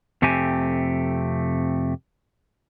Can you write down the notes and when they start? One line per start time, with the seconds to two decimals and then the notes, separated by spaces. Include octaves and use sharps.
0.22 F2 C3 A3 C4 G4 G#5